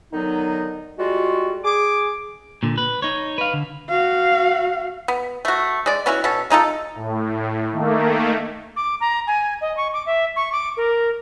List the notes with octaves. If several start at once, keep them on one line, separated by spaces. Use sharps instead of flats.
D3 D#3 F#3 B3 D#4
G3 G#3 F4 F#4
G#4 D6
A#2 D3
B4
D#4 C#5
B4 F5
D3
F#4 F5
B3
A3 F#4
G#3 D5
B3 C#4 E4 F#4
B2 C#4 A4
G#3 D#4 F4 A4
A2
D#3 A3 A#3
D6
A#5
G#5
D#5
C#6
D6
E5
C#6
D6
A#4